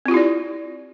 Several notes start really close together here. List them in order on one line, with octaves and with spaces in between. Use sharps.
C4 F4 G4 E4 D5